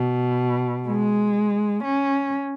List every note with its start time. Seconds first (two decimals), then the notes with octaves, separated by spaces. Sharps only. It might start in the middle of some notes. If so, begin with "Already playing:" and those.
Already playing: B2
0.87 G#3
1.84 C#4